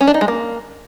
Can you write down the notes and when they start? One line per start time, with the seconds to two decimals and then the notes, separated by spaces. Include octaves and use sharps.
0.01 C#4
0.07 D4
0.14 D#4
0.21 G#3
0.28 A#3